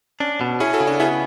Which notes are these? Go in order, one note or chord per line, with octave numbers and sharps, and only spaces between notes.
C#4 D4
B2
C#4 E4 G#4
F#4 A4
C#3
D4 F#4
B3 E4 G#4